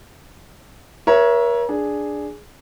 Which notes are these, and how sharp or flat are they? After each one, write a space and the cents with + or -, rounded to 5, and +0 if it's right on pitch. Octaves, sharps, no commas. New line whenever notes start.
A#4 +35 C#5 +0 E5 +10
D4 +0 G#4 +0